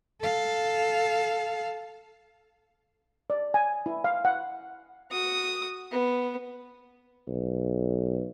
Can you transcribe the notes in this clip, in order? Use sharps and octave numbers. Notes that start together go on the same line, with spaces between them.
A4 F5
D5
G#5
E4
F5
F#5
F#4 D#6
B3
B1